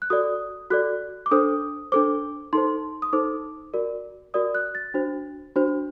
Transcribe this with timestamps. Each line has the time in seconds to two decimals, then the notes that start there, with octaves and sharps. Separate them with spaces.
0.02 F#6
0.10 F#4 A4 D5 D#6
0.70 F#4 A4 D5 F#6
1.26 D6
1.31 D4 A4 C5 D#6
1.92 D4 A4 C5 D6
2.53 D#4 A4 C5 C6
3.02 D#6
3.13 D#4 A4 C5 D6
3.74 F#4 A#4 D5
4.34 F#4 A#4 D5 D#6
4.55 F#6
4.75 A6
4.94 D4 F#4 C5
5.56 D4 F#4 C5